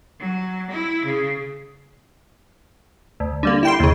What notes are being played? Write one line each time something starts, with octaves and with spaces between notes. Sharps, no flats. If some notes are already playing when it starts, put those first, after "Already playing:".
F#3
E4
C#3
D2
D3 G3 A#3
E4 G5 C6
D#2 C#3